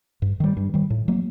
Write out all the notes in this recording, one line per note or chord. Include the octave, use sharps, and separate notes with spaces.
G2
D#3 G3
G2
D#3 G3
A2
F#3 A#3